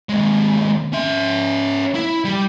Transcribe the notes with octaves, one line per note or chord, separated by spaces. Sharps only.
D#2 G#3
C#4 E5
E4
G3